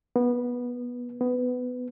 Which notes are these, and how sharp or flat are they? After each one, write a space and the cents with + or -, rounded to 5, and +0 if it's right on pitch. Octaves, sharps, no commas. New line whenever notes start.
B3 -15
B3 +15